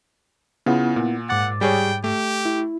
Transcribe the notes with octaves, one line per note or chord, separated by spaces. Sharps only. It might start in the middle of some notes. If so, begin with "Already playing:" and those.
C#3 B3 E4 F4 F#5
A#2
G#2 F#5 D6 A6
G3 G#4 C#5 G5
A3 G4
E4